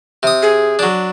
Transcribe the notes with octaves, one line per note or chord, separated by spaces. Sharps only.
C3 D#6
G#4
F#3 D4